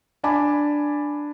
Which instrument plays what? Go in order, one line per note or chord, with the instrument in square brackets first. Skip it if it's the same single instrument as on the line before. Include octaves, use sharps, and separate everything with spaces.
[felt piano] D4 D5 G#5 A5 B5 D6